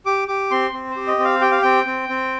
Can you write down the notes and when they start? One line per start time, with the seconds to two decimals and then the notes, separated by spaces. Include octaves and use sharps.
0.06 G4 D6
0.28 G4 D6
0.51 C4 C6
0.73 C4
0.90 C5
0.96 G4
1.07 D#5
1.19 C4
1.25 F5
1.41 G4 G5
1.51 F5
1.62 C4 G5
1.86 C4
2.09 C4